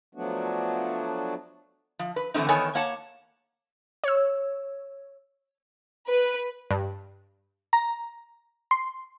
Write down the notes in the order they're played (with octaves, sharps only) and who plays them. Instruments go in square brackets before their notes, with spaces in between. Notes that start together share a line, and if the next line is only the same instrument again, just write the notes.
[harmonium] F3 F#3 A3 B3 D4 F#4
[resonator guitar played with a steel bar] F3
B4
D3 E3 A3 C4 D#4
E2 D#3 B3 A4 C#5 G#5
A#3 C#5 F#5 A5
[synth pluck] C#5 E6
[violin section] B4
[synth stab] G2
A#5
C6